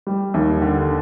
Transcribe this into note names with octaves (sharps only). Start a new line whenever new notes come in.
G3
D#2
D3